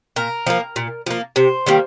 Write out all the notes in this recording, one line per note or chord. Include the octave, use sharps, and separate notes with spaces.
A#2 A#4
F3 A#3
A#2
F3 A#3
C3 C5
D#3 G3 A#3